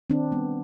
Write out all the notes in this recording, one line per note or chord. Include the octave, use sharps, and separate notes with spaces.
D#3 C4 D4
G3 B3